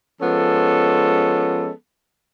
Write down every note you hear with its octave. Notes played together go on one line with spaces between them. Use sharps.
F3 G#3 B3 C#4 A4